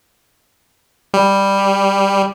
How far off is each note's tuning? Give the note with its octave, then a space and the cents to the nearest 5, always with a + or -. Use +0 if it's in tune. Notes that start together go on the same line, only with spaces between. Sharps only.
G3 +5